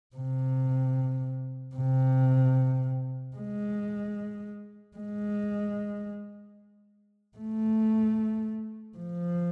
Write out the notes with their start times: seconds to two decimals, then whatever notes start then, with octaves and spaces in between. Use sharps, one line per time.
0.16 C3
1.76 C3
3.36 G#3
4.97 G#3
7.37 A3
8.98 F3